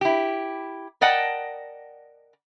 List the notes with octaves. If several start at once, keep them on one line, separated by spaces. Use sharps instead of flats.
E4 G4
A#4 D5 D#5 F#5 G5 A5